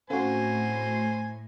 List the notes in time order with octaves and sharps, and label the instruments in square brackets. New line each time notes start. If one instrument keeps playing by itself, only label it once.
[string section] A2 [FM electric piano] C4 F#4 [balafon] C#4 A4 F5 [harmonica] C5 G#5